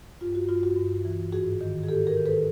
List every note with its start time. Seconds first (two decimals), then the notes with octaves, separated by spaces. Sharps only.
0.21 G2 F4
0.35 F#4
0.49 G2 F4
0.63 F#4
0.77 G2
1.05 E3
1.32 G#2 F#4 G#4
1.61 D#3
1.83 G#4
1.89 G#2 G4 A4
2.07 G#4 A#4
2.17 D#3
2.26 A4 B4